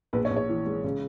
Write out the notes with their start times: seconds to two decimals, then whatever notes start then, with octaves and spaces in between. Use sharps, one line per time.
0.13 A#1 B4
0.25 C#5
0.31 A#1
0.36 C#5
0.49 E3
0.66 G#3
0.84 C#3